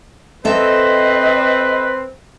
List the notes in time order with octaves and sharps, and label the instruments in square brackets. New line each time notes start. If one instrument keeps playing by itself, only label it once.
[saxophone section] C4 [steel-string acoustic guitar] A4 E5 [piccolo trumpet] B4 [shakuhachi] D#5